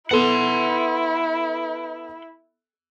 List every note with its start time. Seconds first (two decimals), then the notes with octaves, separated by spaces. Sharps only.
0.11 B3 E4 A4 F#5 C6